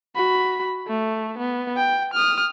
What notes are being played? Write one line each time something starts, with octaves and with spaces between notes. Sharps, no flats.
F#4 B5
A3
B3
G5
D#6 F6